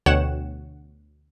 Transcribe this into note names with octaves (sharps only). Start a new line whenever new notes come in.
D2 B2 C#5 F#5 G5 E7